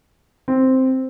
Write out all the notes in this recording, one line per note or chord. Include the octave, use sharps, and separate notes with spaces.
C4